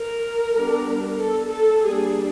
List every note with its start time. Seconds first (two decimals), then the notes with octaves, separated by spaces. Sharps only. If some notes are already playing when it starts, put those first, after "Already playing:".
Already playing: A#4
0.56 G3 B3 D4
1.19 A4
1.50 A4
1.82 G3 A#3 D4 G#4